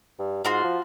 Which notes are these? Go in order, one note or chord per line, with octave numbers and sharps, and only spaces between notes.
G2
G#2 F4 F#4 C6
F3